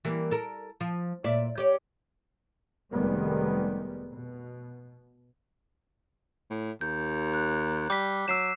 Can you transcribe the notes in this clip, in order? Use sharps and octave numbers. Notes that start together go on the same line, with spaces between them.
E3 G3 A#3
A4 A#4
F3
A#2 D5 E5
G4 C#5 D5
F1 D#3 G3 G#3 B3
B2
A2
D#2 G6
F#6
G3 D6 B6
F#3 E6 C7 E7